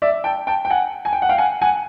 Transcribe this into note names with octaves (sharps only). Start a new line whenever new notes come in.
D5 E5
G5 A5
G5 A5
G5
F#5 G#5
G#5
G5
F#5
F5 G5
F#5 G#5
F#5 G#5